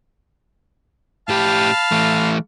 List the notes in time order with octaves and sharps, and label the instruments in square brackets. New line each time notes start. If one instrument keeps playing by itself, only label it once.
[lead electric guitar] A2 G4 [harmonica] F5 A5 B5
[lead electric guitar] E3 A3